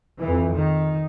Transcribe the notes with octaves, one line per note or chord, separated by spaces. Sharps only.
F2 E3
D#3